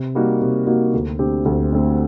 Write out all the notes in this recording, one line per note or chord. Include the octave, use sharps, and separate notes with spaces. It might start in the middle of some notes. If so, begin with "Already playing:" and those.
Already playing: C3
G3 A#3 D#4 F#4
C3
G3 A#3 D#4 F#4
D2
D3 A3 C4 G4
D2
D3 A3 C4 G4